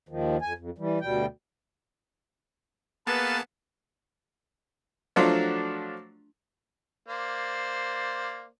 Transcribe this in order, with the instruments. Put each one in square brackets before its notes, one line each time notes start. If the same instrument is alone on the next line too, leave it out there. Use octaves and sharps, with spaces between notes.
[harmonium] D#2 D#3 F3
F2 G#5
F2
E3 G3
D2 B2 G3 G5
[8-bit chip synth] A#3 G#4 A5 [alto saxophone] B3 [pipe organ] A4 B4 F5 [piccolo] A6
[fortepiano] F3 F#3 A3 D4 F4 F#4
[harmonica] A#3 C5 D5